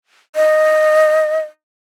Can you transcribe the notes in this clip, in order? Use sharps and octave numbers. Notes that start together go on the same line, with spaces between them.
D#5